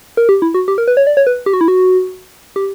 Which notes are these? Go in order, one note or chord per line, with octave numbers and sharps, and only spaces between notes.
A#4
G4
E4
F#4
G4
A#4
B4
C#5
D5
C#5
B4
G4
F#4
E4
F#4
G4